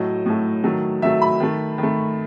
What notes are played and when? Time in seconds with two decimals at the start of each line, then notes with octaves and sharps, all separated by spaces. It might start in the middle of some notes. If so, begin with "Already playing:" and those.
Already playing: A2 F#3 A3 D#5
0.26 A2 F#3 A3
0.64 D#3 F#3 A3
1.02 D#3 F#3 A3 E5
1.22 B5
1.40 D#3 A3
1.78 D#3 A3